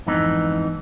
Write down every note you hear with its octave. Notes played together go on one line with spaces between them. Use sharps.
F2 G#2 E3 B3 D#4